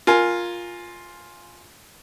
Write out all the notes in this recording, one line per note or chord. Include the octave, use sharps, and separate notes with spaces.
F4 A#4 G#5